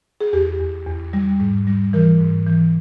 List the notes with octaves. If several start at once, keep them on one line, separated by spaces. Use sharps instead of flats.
G#4
E2 G4
E2
E2
G3
G#2
G3
E3 A#4
G#2
E3